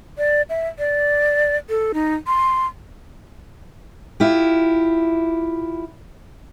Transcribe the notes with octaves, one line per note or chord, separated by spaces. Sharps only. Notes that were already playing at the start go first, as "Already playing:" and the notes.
D5
E5
D5
A4
D#4
C6
E4 F4 G4